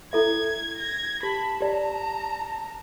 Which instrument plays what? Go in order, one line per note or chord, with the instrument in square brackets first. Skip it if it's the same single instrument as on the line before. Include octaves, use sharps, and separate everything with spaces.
[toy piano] E4 A4 E5 [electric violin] G#6
[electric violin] G#6 A#6
[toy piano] G4 [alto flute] A5 [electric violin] B5
[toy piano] G4 D5 [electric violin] A#5